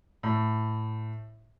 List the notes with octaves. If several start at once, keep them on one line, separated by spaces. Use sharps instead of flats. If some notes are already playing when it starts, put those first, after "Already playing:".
A2